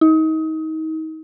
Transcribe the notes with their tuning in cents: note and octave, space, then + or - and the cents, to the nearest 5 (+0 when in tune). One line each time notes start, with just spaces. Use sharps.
D#4 +30